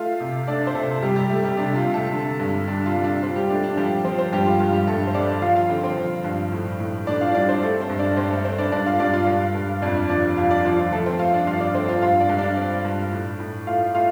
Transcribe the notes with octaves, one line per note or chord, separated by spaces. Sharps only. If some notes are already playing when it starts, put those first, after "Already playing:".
Already playing: A3 F4 F5
C3
A3 D4 D5
C5
C3 A3 A4
C3 G3 G4
G3 G4
A3
G3 G4
C3 D4
F4
C3
A3 A4
D3
G2
G3 D4
F4
G3
D4
C4 F4
G3 G4
A3 D4
D4
F3 G3 G4
F3 C4 C5
C4 C5
G2 G3 G4
F4
G2 F4
G3 G4
G2 A3 A4
C5
G3 D4 D5
F3 F4 F5
F4 F5
D3 C4 C5
C4 C5
F3
G2
A2
A2
A2 D4 D5
F4 F5
G3 D4 D5
C4 C5
A3 C4 A4
C4 C5
G2
D4 D5
G2 C4 C5
A3 A4
C4 C5
D4 D5
G2 D4 D5
F4 F5
G2 D4 D5
F4
G2
G2
F2 D4 D5
F3 D4 D5
F2 F4 F5
D4 D5
F3 F4
F4
F3 A3 A4
C4 C5
A3 F4 F5
D4 D5
G2 F4 F5
D4 D5
A3 C4 C5
F4 F5
G2 F4 F5
D4 D5
G2
D4 D5
C4
G2
A2
A2
A3 F4 F5
A3 F4 F5